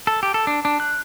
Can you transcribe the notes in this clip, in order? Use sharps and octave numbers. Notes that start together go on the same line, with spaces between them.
A4
G4
A4
D4
D4
F#6